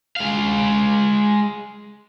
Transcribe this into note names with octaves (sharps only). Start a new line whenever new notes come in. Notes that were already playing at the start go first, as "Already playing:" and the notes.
G#3 F5